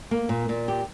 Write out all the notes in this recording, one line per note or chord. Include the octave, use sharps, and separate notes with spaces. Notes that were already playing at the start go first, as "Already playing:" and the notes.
A#3
A#2
A#2
G4